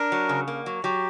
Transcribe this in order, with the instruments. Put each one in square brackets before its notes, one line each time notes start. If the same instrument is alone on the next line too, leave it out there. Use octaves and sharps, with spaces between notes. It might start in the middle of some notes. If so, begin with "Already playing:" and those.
Already playing: [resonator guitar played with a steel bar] D4 [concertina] A#4
[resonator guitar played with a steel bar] F#3
C#3
A#3
F#3
[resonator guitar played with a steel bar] F#3 [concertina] G4